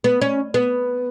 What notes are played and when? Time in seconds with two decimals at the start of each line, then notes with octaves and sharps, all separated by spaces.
0.04 B3
0.21 C#4
0.54 B3